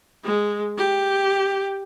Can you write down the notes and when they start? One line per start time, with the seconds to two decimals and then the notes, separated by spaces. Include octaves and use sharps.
0.24 G#3
0.78 G4